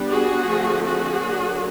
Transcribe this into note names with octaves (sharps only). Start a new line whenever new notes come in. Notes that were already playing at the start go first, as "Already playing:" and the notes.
Already playing: G3 B3 D4
F#4 G#4
D3 F3 A3 C4
F#4 G#4
D3 F#3 A#3 D4